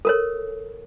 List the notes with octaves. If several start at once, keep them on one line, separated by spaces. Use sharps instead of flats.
A4 A#4 C#5